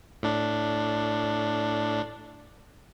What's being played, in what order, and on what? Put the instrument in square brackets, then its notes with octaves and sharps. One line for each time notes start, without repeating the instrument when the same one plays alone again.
[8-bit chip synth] A2 D4